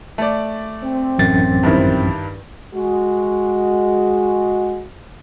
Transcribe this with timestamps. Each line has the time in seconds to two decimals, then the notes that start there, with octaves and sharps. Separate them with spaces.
0.18 A3 D5
0.84 C4
1.18 A1 F#2 A6
1.63 G2 D#3 E4
2.74 G#3 F#4